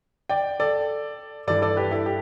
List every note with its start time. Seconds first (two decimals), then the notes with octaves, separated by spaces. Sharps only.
0.29 D5 G5
0.60 A4 D5
1.47 G2 E3 A4 D5
1.62 A4 D5
1.77 G4 B4
1.91 E4 A4
2.06 G4